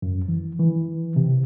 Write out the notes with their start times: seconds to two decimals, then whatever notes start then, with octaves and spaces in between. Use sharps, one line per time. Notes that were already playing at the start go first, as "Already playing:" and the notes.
0.02 F#2
0.28 E3
0.59 E3
1.16 C3